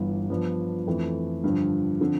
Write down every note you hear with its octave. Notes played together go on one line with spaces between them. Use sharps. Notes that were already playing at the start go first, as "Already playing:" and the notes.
Already playing: G1 G2 E3
G2 F3 B3 D4
F2 E3 A3
G2 D3 F3
D3 F3 C4